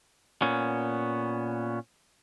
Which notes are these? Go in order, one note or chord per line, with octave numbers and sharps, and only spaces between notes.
A#2 B3 C#4